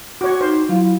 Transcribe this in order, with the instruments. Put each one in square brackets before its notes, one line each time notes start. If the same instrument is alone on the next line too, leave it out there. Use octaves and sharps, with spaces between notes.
[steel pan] F#4 C#5 [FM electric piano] D6
[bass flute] D#4 [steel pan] C5
[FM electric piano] F#3 [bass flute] E4 [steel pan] F4